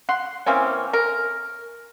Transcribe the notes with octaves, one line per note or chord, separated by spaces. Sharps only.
F#5 C6
E3 A#3 C4 C#4
A#4